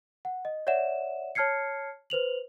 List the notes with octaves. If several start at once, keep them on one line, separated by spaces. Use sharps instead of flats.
F#5
D#5
C#5 D5 E5 F#5 E7
C#5 A5 F6 G#6 C7 C#7
B4 C5 F7 F#7